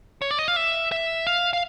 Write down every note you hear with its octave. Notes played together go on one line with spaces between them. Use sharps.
C#5
D5
D#5
F5
E5
E5
F5
F5